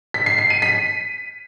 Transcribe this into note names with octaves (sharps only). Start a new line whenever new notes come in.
B6
C7
C7
D#7
B6